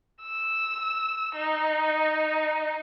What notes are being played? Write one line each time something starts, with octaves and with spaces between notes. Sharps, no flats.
E6
D#4